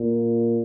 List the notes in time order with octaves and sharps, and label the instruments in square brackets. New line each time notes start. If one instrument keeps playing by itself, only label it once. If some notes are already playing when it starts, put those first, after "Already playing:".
Already playing: [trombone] A#2